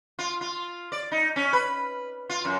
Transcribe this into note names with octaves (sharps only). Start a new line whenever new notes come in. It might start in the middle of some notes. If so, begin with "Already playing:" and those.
F4
F4
D5
D#4
C#4
B4
F4
F#2